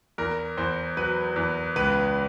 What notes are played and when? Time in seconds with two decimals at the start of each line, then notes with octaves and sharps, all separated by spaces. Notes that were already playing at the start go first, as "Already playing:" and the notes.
0.18 E2 A#4
0.58 E2 C5
0.97 F#3 B4
1.36 E2
1.76 C#2 B4